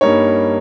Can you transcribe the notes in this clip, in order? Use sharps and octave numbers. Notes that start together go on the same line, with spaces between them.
G2 G3 A#3 D#4 C#5